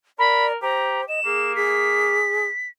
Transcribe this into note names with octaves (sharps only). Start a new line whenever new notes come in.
A#4 D5 B5
G4 C5 A#5
D#5 E7
A#3 G#4
G#4 B6